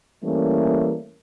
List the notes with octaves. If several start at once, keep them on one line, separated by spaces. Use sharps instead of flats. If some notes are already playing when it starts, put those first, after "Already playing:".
E3 G3 A3 A#3 C#4